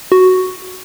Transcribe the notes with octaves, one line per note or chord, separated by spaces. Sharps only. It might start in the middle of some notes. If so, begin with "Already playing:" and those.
F#4